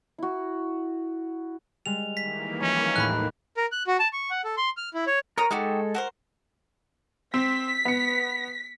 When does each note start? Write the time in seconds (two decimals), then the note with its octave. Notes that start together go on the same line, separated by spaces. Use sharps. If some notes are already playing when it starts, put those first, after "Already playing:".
0.18 E4 F#4
1.86 G3 G#3 F7
2.17 D#3 E3 A#3 B6
2.61 F3 C#4
2.96 A1 D#2 A2 B5 F#6
3.57 A#4
3.72 F#6
3.87 F#4
3.99 A5
4.13 C#6
4.30 F#5
4.44 A4
4.57 C6
4.77 F6
4.94 E4
5.07 C#5
5.38 A#4 C#5 A#5 D#6
5.51 G#3 D#4 F#4 G4 A4
5.95 F#4 A#4 C5
7.34 C4 B6
7.85 B3 C#7